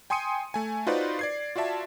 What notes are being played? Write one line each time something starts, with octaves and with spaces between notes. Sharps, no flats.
G5 G#5 C6 D#6 C#7 D#7
A3 G#5
D#4 F4 F#4 B4 C5 D5
D5 G#6 C7
F4 F#4 D5 E5 A5